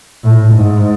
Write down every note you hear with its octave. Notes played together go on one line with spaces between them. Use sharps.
A2
G#2